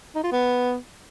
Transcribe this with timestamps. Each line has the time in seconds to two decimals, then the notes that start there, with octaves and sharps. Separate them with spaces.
0.15 D#4
0.24 F4
0.32 B3